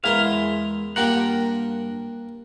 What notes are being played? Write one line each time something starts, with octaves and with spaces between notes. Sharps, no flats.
E2 G#3 E4 A#4 F5 C6
G2 A#3 F4 G4 A#4 F#5